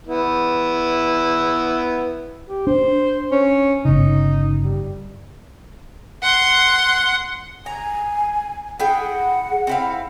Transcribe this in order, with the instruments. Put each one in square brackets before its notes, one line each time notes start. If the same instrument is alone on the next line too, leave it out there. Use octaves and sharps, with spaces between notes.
[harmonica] B3 E4
[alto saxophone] G4
[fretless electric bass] D4 [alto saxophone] C5
[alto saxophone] C#4
[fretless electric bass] G1 C#3 [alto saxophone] D#4
[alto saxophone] G3
[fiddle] F#5 C6
[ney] G#5 [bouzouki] A#5
[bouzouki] E4 G#4 G5 [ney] F#5
[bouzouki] C4 E4 F5